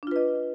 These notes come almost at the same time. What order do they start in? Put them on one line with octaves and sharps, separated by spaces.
D4 F4 B4 D#5